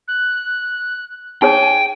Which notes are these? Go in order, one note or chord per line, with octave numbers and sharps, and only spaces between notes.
F#6
D#4 G#4 C#5 G5 G#5